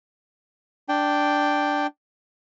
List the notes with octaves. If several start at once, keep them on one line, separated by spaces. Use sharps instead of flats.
D4 G5